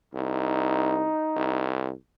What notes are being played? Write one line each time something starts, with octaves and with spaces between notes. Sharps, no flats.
C2 D#4
C2